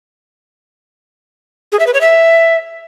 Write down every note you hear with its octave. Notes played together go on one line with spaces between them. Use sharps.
G#4
E5
B4
C#5
E5